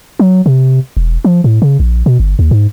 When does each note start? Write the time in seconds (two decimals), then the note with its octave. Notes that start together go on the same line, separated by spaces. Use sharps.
0.19 F#3
0.46 C3
0.97 E1
1.24 F3
1.44 A2
1.62 C#3
1.80 A#1
2.06 B2
2.20 G1
2.39 D#2
2.51 G#2